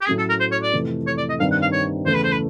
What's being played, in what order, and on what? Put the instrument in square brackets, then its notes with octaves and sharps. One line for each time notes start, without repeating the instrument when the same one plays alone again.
[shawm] G4
[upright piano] A2 F#3 A3 C#4 [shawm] G#4
[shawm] A4
A#4
C5
C#5
D5
[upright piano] F2 C3 E3 A3
[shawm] C#5
D5
D#5
[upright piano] G2 D#3 G3 C4 [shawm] F5
[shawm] F#5
F5
C#5
[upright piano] E2 C#3 E3 A3 [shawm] C5
[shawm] B4
C5
B4